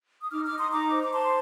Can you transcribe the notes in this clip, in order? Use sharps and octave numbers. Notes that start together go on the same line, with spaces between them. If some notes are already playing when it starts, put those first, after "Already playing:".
D#6
D#4 D6 F6
D6 F6
D#4
C6 D#6
D#4 A#5 D6
C5
D6
C5 A5 C6